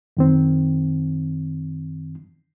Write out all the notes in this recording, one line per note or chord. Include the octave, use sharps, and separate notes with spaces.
F#2 D#3 C4